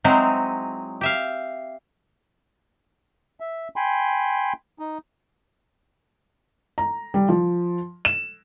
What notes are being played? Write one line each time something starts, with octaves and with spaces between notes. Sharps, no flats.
F#3 G#3 C4 D#4 E4
G4 E5 F5
E5
G5 G#5 B5 C6
D#4
A#5
G3
F3
E7